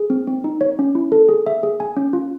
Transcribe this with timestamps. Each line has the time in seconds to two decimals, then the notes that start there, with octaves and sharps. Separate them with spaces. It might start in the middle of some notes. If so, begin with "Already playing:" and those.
Already playing: G#4
0.10 C4
0.27 C4
0.44 D#4
0.61 C#5
0.79 C#4
0.95 E4
1.12 A4
1.29 G#4
1.46 E5
1.63 G#4
1.80 G#5
1.97 C#4
2.13 F4